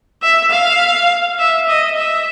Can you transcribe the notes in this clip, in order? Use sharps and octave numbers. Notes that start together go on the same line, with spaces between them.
E5
F5
E5
D#5
E5